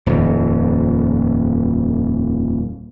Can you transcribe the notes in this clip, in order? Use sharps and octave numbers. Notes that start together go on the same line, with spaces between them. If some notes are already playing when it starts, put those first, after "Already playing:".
D#1 F2